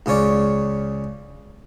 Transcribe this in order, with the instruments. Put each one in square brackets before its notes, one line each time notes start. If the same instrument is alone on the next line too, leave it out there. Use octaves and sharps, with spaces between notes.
[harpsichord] C#2 C#3 C#4 C#5 D5